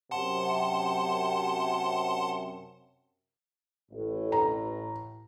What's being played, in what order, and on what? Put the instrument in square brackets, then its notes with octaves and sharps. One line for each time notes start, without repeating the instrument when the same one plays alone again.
[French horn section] F#2 C3 [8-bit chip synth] F#5 A5 C6
[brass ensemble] A1 [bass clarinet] A2
[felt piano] A#5